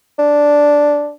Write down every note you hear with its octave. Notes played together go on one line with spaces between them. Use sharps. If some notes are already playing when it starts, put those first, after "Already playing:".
D4